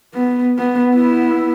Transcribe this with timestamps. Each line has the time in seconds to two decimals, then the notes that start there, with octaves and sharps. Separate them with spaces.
0.14 B3
0.58 B3
0.94 B3 E4